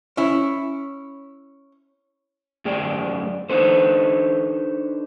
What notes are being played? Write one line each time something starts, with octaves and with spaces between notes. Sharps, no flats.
C#4 E4
F#2 A3 G#4 D5 G5
D4 D#4 A4 B4 C5